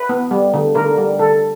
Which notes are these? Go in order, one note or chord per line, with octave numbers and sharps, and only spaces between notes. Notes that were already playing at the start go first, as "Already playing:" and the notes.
Already playing: B4
B3
G3
D3
D3 A#4
G3
D3 A4